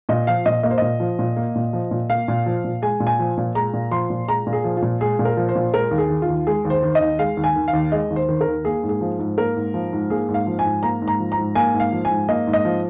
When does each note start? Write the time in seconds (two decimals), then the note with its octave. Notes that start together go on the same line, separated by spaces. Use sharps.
0.09 A#2 D#5
0.27 F3 F5
0.46 A#2 D#5
0.63 A#3 D#5
0.71 C5
0.78 A#2 D#5
1.00 F3
1.19 A#2
1.36 A#3
1.55 A#2
1.73 F3
1.91 A#2
2.09 A#3 F5
2.28 A#2
2.46 F3
2.64 A#2
2.82 G#3 G#5
3.00 A#2
3.07 G#5
3.19 F3
3.37 A#2
3.55 G#3 A#5
3.73 A#2
3.91 F3 C6
4.10 A#2
4.28 G#3 A#5
4.47 A#2
4.53 G#4
4.64 F3
4.77 F4
4.82 A#2
5.00 G#3 G#4
5.19 A#2
5.25 A#4
5.37 F3
5.49 C5
5.55 A#2
5.73 G#3 A#4
5.91 D#2
5.98 G#4
6.10 D#3
6.22 F4
6.29 D#2
6.47 G#3 G#4
6.65 D#2
6.70 C5
6.83 D#3
6.95 D#5
7.01 D#2
7.19 G#3 F5
7.37 D#2
7.44 G#5
7.56 D#3
7.68 F5
7.73 D#2
7.92 G#3 D#5
8.10 D#2
8.16 C5
8.29 D#3
8.41 A#4
8.47 D#2
8.65 A#3 G#4
8.83 G#2
8.89 G#4
9.01 F3
9.19 G#2
9.38 A#3 A#4
9.56 G#2
9.74 F3
9.93 G#2
10.10 A#3 G#4
10.28 G#2
10.34 F5
10.47 F3
10.59 G#5
10.65 G#2
10.83 A#3 A#5
11.02 G#2
11.08 A#5
11.20 F3
11.32 A#5
11.37 G#2
11.55 A#3 G#5
11.74 G#2
11.80 F5
11.92 F3
12.05 G#5
12.10 G#2
12.29 A#3 D#5
12.47 G#2
12.53 D#5
12.65 F3